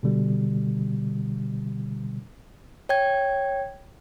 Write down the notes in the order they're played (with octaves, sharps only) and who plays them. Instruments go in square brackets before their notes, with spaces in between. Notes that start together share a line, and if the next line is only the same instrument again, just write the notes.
[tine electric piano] B2 D3 G3
[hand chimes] C#5 G5 G#6